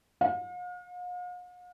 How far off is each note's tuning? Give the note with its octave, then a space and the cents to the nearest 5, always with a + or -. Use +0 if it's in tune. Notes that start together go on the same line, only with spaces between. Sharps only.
F5 +45